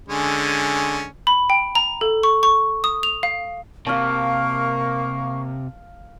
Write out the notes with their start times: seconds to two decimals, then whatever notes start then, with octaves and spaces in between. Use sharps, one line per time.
0.09 D3 G#3 C#4
1.27 B5
1.50 G5
1.75 A#5
2.01 A4
2.23 C#6
2.43 C#6
2.84 D#6
3.03 F7
3.23 F5
3.87 C3 A#3 F5 A5 C#6